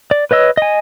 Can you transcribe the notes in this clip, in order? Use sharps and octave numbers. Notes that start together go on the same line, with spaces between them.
D5
B4 C#5 D#5 E6
D#5 G#5